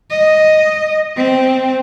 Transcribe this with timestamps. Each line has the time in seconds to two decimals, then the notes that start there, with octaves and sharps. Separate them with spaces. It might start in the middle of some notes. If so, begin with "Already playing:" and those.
0.10 D#5
1.17 C4